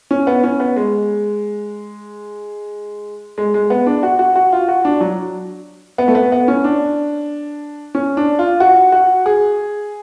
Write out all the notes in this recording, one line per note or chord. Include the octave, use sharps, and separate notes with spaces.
C#4
B3
C#4
B3
G#3
G#3
G#3
B3
D4
F#4
F#4
F#4
F4
F#4
D4
F#3
B3
A3
B3
B3
C#4
D4
C#4
D4
F4
F#4
F#4
G#4